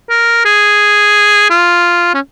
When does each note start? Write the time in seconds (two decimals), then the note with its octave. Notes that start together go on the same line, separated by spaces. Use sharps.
0.10 A#4
0.45 G#4
1.50 F4
2.14 C#4